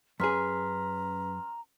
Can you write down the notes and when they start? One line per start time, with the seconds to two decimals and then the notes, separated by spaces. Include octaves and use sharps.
0.20 F#2 C#4 G#4 B4 A#5 C6 F6 B6